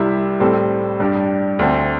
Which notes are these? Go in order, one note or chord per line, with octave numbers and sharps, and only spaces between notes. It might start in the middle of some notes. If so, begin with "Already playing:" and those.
Already playing: C2 C3 G3 E4
A2 G3 C4 A4
G2 G3 D4
D2 D3 C4